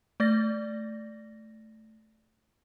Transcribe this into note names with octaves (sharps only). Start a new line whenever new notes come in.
A3 D5 A6 A#6